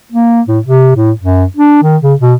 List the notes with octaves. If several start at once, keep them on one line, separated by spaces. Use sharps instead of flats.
A#3
A2
C3
A2
F#2
D4
D#3
C#3
B2